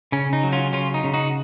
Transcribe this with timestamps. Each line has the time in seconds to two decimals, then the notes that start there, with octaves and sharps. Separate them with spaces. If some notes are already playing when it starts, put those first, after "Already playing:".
0.12 C#3 C#4
0.33 D#4
0.43 F#3
0.52 C#4 F4
0.73 C#3 C#4 F4
0.94 D#4
1.04 C#3
1.14 D#4 F#4